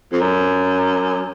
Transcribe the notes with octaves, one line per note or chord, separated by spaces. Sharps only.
F2
F#2